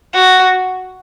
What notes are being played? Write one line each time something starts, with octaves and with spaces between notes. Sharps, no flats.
F#4